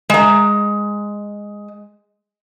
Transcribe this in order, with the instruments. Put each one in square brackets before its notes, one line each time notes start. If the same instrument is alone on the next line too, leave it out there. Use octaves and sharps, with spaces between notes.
[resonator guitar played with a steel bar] G#3 A#5